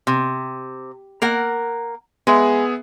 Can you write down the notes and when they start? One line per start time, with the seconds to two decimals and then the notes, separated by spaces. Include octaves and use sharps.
0.07 C3
1.22 A#3 A#4 F#5
2.27 G#3 B3 G#4 E5